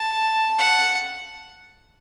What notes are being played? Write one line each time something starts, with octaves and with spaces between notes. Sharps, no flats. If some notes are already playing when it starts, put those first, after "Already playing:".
Already playing: A5
F#5